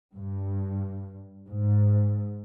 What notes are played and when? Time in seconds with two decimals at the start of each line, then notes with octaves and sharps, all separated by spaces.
0.15 G2
1.48 G#2